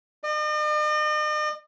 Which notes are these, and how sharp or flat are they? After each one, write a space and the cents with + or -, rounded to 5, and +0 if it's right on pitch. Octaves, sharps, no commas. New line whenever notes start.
D#5 -45